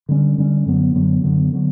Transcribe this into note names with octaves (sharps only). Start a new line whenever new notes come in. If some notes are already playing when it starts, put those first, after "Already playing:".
D3 G3 C#4
D3 G3 C#4
F#2 D3 F#3 B3
F#2 D3 F#3 B3
F#2 D3 F#3 B3
D3 F#3 B3